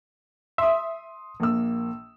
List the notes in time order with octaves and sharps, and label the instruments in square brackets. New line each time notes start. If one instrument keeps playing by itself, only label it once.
[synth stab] E5 [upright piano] C6 D#6
[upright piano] A#1 A#3 E6